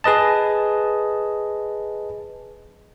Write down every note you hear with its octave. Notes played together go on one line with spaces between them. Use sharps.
G#4 B4 D#5 A5